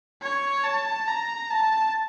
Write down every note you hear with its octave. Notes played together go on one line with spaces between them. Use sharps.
C#5
A5
A#5
A5